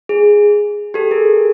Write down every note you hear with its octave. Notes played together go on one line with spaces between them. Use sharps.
G#4
G4 A4
G#4 A#4